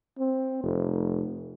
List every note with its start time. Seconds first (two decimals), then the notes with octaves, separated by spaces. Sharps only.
0.19 C4
0.63 F1